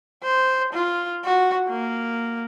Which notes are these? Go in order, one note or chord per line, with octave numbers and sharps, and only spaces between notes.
C5
F4
F#4
A#3